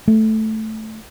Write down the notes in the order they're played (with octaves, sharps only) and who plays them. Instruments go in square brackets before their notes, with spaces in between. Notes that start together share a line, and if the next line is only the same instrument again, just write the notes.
[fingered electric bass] A3